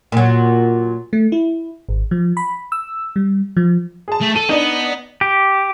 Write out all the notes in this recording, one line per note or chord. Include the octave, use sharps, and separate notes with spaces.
A#2 F#3
A3
E4
G#1
F3
B5
E6
G3
F3
G#4 A5
A3
A4 D#7
B3 D4 D#4
G4